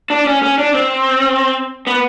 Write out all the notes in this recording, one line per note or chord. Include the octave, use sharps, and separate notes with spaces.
D4
C#4
C#4
D4
C4
B3